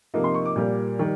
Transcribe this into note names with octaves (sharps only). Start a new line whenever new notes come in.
C3 F3 A#3 D#4
C6
C#6
D6
A#2 G3 A#3
D#3 G3